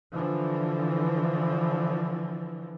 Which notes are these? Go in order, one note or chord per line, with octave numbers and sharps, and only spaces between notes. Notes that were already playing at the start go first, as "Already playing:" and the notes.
D3 E3 F3